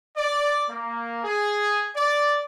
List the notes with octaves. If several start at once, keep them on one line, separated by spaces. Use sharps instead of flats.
D5
A#3
G#4
D5